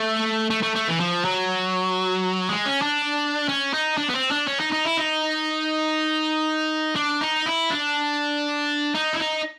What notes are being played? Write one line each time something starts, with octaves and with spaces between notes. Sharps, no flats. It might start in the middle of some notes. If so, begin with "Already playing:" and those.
Already playing: A3
A3
A3
A3
E3
F3
F#3
G#3
C#4
D4
C#4
D#4
D4
B3
C4
D4
C#4
D#4
D#4
E4
D#4
D4
D#4
E4
D4
D#4
E4
D#4